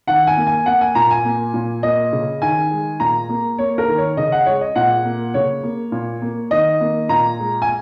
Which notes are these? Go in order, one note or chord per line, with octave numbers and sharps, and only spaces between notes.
D#3 F#5
G#5
A#3
G#5
A#3 F#5
G#5
A#2 A#5
G#5
A#3
A#2
A#3 D#5
C#3
D#3 G#5
G#3
A#2 A#5
A#3
A#3 C#5
A#4
D#3
C#5
C#3 D#5
F#5
G#3 C#5
D#5
A#2 F#5
A#3
C#3 C#5
A#3
A#2
A#3
D#3 D#5
A#3
A#2 A#5
G#3
G#5